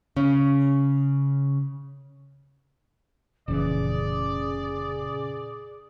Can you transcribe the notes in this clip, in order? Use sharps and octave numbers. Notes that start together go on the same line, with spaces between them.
C#3 C#4
F1 A#2 C#3 E3 C#4 G#4 D5